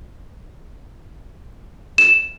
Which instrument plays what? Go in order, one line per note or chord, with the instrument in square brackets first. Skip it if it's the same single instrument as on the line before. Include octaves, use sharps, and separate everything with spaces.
[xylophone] E7